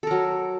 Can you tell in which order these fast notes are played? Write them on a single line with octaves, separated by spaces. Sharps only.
A4 A#4 F#3